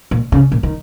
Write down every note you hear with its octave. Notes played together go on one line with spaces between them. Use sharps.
A#2
C#3
A#2
D#3